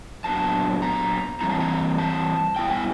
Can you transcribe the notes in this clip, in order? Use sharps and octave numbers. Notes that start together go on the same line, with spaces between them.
A#2 F#3 B3 D4 A5
A#5
E3 G3 C4 E4 A#5
A5
A#5
A5
B2 G3 B3 E4 G5
G#5